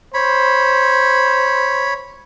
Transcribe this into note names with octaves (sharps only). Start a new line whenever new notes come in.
C5 C#5 B5